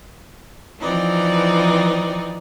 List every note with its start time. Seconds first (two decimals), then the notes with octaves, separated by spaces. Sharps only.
0.81 E3 F3 C4 D#4 D5